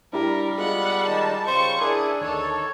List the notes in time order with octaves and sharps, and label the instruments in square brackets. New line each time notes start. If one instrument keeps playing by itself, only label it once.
[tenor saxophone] G3 [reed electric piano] D4 E4 G4 [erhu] A#4
[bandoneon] G#3 B3 [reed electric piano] F4 G#4 [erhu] F#5
[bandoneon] D#3 G#3 D#4 [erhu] A5
[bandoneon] C#3 G3 [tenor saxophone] C5 [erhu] C#6
[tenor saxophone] D4 [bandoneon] E4 [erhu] G#4 [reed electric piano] A#4
[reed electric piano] D2 [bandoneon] D#3 C#5 [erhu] A4